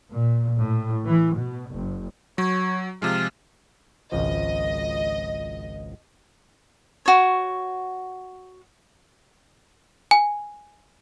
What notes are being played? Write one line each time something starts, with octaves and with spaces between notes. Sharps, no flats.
A#2
A2
E3
B2
F#1
F#3 C#5
C3 F3 G#3 F4
G#1 C#2 F3 D#5
F#4 C#5
G#5